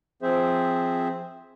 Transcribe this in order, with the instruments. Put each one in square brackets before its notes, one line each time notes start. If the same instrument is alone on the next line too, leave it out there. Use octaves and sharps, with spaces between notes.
[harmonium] F3 C4 G#4 C5 E5